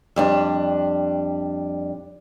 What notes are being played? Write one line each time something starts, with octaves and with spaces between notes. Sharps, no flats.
F2 G3 D4